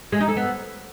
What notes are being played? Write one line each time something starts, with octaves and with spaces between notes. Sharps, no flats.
G#3
D#4
A4
B3